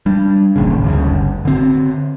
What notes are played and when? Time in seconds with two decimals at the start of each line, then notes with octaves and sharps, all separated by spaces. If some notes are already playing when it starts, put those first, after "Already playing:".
0.06 G3 D4
0.56 D#1 A1 D#2 C#3
0.84 D2 G2 C#3
1.10 G1
1.45 D3 C4